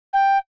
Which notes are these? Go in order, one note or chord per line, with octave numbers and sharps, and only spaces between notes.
G5